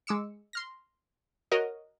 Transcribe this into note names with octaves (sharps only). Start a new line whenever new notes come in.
G#3 D6 E6 C#7
C6 F6 A#6
F#4 A#4 C#5 D#5